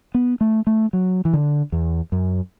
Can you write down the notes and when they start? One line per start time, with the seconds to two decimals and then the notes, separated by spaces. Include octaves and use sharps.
0.15 B3
0.41 A3
0.67 A3
0.93 F#3
1.25 E3
1.33 D3
1.72 E2
2.12 F#2